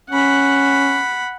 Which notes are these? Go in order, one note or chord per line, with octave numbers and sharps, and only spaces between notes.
C#4 F#5 B5